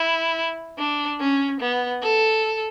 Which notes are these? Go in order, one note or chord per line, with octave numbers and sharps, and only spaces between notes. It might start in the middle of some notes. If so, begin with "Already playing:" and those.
Already playing: E4
D4
C#4
B3
A4